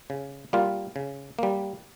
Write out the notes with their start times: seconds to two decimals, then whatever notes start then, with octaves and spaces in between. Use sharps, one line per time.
0.10 C#3
0.53 G3 A#3 F4
0.96 C#3
1.39 G3 A#3